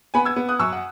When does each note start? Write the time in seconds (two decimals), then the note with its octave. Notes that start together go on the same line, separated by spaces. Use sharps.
0.14 B3 G#5 B5
0.25 E6 G#6
0.36 B3
0.49 D#6 F#6
0.59 F#2 C#6 E6
0.73 F#5